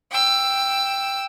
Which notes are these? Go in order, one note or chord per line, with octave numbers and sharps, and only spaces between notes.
G5 E6